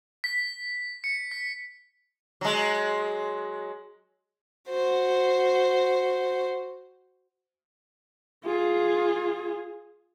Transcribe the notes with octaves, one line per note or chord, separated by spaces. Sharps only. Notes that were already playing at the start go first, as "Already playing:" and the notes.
B6
C#7
B6
F#3 G#3
F#4 C5
F4 G#4